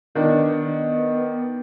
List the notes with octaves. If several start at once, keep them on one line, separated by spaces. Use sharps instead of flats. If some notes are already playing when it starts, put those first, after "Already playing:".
D#3 B3 D4